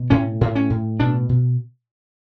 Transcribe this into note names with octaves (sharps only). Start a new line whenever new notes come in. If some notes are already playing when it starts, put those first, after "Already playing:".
Already playing: B2
A2 C#4
A2
C#4
A2
B2 D4
B2